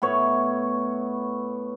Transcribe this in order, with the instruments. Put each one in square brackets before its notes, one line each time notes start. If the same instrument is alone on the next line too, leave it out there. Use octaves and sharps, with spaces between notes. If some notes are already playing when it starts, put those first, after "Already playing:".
[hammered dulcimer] A2 B3 C#5 B5